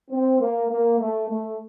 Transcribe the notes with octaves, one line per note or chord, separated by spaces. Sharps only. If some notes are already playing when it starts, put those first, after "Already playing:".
C4
A#3
A#3
A3
A3